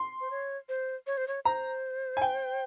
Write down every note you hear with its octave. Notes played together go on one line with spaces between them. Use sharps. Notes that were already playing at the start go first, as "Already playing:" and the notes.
Already playing: C6
C5
C#5
C5
C#5
C5
C#5
C5 A#5
G#5
G5